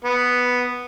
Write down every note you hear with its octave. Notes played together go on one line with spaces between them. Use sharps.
B3